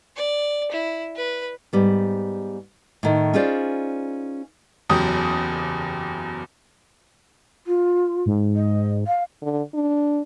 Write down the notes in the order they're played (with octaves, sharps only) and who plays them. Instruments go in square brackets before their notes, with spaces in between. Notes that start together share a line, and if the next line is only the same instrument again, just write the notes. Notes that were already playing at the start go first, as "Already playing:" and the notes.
[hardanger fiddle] D5
E4
B4
[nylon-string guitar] G#2 G3 B3
A2 D#3
C#4 D#4 F4 G#4 C5 D5
[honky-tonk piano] F#1 E2 F#3 G4 D#6
[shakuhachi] F4
[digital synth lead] G#2
[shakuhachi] D#5
F5
[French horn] D3
D4